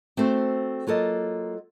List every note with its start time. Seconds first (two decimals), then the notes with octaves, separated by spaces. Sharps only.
0.17 A3 C4 F#4 A4 C5
0.87 F#3 A#3 F4 A4 D#5